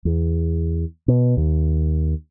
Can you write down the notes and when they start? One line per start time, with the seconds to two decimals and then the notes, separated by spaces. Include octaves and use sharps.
0.05 E2
1.08 B2
1.37 D#2